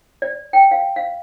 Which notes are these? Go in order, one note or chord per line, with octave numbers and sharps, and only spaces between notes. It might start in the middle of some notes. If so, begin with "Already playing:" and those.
D5
G5
F5
F5